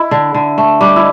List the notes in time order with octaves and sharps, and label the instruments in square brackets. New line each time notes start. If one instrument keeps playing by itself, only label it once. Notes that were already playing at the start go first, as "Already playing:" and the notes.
Already playing: [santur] E4
[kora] D3
D3
A3
[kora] G3 [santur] D4
[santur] E4